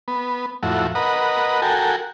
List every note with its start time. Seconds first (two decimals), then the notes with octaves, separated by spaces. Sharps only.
0.08 B3
0.63 F2 A2 E4 F#4
0.95 A#4 B4 D#5 F#5
1.62 F#4 A4 A#4 G5 G#5